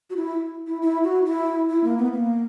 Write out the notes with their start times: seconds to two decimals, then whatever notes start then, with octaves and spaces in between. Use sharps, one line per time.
0.10 F#4
0.16 E4
0.67 E4
0.82 E4
1.04 F#4
1.26 E4
1.70 E4
1.84 A#3
1.98 B3
2.13 A#3